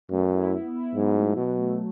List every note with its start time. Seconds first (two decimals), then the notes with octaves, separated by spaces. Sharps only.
0.11 F#2 A3
0.32 E4
0.53 B3
0.73 E4
0.95 G#2 F#3
1.15 A3
1.36 B2 F#3
1.58 A3